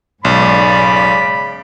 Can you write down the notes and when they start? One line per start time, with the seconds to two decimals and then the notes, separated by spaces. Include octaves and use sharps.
0.25 B1 G#2 C#3 G#3 D5 B5